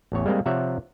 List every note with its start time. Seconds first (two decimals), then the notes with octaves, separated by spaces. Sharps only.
0.12 A1 E2 C#5
0.25 G3 G#3 A#3 C4
0.46 C3 F3 C#5 D5 E5 F#5